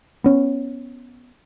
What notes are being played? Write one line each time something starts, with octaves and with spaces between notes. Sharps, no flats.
B3 C#4